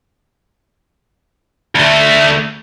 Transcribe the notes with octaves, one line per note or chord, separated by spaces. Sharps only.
D2 A3